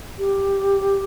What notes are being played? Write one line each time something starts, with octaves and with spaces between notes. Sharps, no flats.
G4